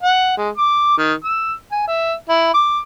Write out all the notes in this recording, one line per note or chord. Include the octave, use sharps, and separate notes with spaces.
F#5
G#3
D6
D#3
E6
G#5
E5
E4
D6